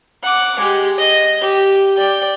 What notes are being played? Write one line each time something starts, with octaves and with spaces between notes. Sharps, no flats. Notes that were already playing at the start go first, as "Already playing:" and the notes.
F#5 D6
G#3 G4
D#5
G4
D5 G5